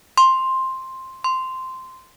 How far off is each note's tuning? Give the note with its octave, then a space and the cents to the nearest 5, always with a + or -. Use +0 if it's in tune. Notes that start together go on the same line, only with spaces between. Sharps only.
C6 +5
C6 -10